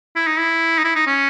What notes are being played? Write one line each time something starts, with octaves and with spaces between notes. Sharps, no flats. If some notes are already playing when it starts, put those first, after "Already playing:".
E4
D#4
E4
D#4
E4
D#4
C#4